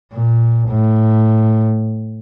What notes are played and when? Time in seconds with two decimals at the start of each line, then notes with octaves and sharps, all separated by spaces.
0.14 A#2
0.69 A2